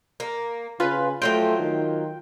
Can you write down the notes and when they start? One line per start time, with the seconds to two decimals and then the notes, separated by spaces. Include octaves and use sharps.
0.20 A#3
0.80 C#3 F4 B4 G#5
1.22 F3 F#3 A3 F4 G5
1.60 D#3